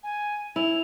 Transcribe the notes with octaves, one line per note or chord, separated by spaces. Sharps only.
G#5
E4 F7